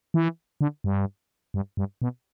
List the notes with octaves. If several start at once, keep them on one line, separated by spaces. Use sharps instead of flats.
E3
D3
G2
G2
G2
B2